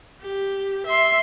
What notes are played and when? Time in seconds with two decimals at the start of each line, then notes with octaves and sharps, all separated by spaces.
0.21 G4
0.86 E5 C6